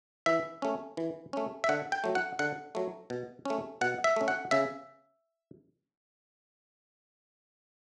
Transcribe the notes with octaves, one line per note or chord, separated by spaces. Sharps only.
E3 E5
A3 C#4
E3
A3 C#4
E5
D3 F#5
G5
F#3 A3
F#5
D3 F#5
F#3 A3
B2
A3 C#4
B2 F#5
E5
A3 C#4
F#5
C#3 E5